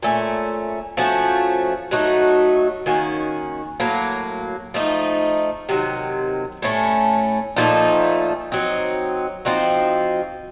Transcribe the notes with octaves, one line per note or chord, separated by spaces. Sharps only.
A#2 A3 C#4
F3 A3 C#4 F#4
F#3 A3 D#4 F#4
D#3 A#3 C#4 F#4
A2 F#3 A#3
F3 A3 D#4
C3 D#3 F#3
A2 A3 C#4
A#2 F3 A3 D#4
F#3 C4 D#4
F3 C4 D#4 F#4